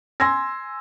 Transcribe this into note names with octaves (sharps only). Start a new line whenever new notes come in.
G#5 C6 E6 G#6 A#6